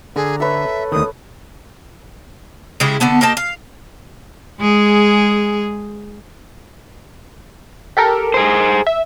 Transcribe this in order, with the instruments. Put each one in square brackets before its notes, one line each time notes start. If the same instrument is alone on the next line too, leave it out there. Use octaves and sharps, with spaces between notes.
[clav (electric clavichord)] D3 [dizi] G#4 [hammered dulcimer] A#5
[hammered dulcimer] A4 B4 C#5 [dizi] E5
[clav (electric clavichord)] D2 D#3 [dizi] D#6
[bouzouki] C#3 G#3 E4 G4
D3 A3 B3 D4
A#3 G4 D#5 A5
F5
[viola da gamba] G#3 G#4
[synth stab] G4 A4 A#4
[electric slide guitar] G#4 C5
[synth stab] E5